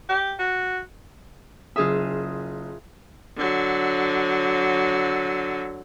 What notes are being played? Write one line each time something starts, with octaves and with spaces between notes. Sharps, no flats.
G4
F#4
F#1 F4 G#4 E5 D#6
D3 F#3